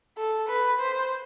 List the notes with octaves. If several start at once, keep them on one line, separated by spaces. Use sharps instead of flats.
A4
B4
C5